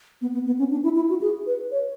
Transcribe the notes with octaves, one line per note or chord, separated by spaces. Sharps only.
B3
B3
B3
C#4
D4
E4
E4
F#4
G#4
B4
C#5